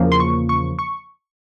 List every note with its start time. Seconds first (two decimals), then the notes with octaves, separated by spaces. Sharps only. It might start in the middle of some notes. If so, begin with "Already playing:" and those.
Already playing: E2 C#3 F3 A#3
0.12 C6
0.20 C#6
0.49 C#6
0.79 C#6